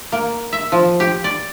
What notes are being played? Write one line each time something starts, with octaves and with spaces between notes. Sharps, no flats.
A#3
E5
F3
G4
D5